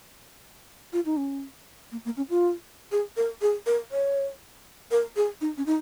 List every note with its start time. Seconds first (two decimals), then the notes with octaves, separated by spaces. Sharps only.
0.93 F4
1.06 D#4
1.17 C#4
1.92 A#3
2.05 A#3
2.17 C#4
2.30 F4
2.92 G#4
3.17 A#4
3.42 G#4
3.66 A#4
3.92 C#5
4.91 A#4
5.16 G#4
5.41 D#4
5.57 C#4
5.66 D#4